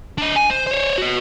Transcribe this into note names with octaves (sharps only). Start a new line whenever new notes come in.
D4 D#5
G#5
C5
C5 C#5
F#4 B4